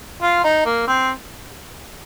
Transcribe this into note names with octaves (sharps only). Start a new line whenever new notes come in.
F4
D#4
A#3
C4